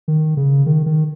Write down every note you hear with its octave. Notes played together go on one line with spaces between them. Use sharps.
D#3
C#3
D#3
D#3